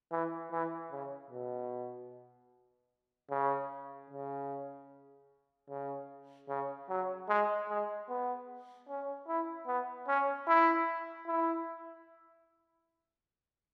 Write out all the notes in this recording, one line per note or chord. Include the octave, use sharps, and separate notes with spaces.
E3
E3
C#3
B2
C#3
C#3
C#3
C#3
F#3
G#3
G#3
B3
C#4
E4
B3
C#4
E4
E4